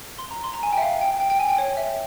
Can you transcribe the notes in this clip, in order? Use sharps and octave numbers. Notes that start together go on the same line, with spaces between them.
C6
A#5
C6
A#5
G#5
G5
E5
F5
G5
G5
G5
G#5
G5
C#5
E5